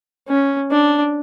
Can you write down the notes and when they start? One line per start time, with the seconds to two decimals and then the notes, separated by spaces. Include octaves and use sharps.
0.28 C#4
0.71 D4